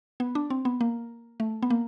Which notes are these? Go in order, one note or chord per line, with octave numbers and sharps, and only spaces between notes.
B3
D4
C4
B3
A#3
A3
B3
A#3